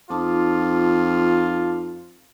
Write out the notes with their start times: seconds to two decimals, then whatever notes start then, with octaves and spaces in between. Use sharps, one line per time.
0.10 F2 D#4 F4 A5 D6